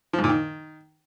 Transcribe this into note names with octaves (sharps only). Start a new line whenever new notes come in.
F3
G#2
A#2
D#3